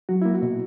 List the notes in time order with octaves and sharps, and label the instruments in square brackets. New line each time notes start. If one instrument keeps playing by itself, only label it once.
[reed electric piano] F#3 F#4
A#3 E4
F#4
B2